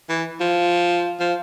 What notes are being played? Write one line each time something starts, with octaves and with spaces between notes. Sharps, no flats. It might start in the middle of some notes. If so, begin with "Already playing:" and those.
E3
F3
F3